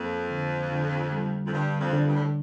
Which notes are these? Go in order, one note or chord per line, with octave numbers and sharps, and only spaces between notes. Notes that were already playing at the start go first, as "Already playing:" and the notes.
Already playing: F2 A#3
D3
D3
G3
F2
G2 D3
F2
D3
G2
A2